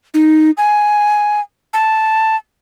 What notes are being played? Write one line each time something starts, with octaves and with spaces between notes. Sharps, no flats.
D#4
G#5
A5